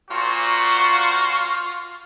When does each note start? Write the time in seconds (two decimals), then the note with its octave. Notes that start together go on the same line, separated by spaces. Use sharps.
0.11 A#2 F4 F#4 C5 C#6